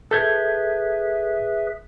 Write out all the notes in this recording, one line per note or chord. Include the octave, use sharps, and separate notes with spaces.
G#4 A4 B4 E5 G6 G#6